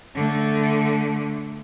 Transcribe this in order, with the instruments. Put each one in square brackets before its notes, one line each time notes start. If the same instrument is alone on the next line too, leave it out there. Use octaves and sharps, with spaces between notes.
[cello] D3 A3